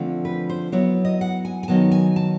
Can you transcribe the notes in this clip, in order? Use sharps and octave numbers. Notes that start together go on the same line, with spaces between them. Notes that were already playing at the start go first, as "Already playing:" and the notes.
Already playing: D3 F3 A3 C4 F4
B4
C5
F#3 B3 E4 C#5
D#5
F#5
G#5
G#5
D#3 F#3 B3 A5
G#5
A5